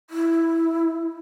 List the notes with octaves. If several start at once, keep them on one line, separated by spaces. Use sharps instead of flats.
E4